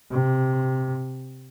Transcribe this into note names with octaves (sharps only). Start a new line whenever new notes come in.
C3